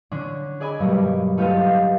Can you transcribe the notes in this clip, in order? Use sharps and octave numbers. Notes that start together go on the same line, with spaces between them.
D3 C#4 D4
G#4 D5 D#5 G#5 B5
G2 B2 F#3 G3 A3 A#3
A3 F4 G4 B4 D#5 F5